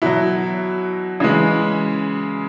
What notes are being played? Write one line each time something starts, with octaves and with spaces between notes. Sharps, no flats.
B2 F#3 E4
C#3 E3 G#3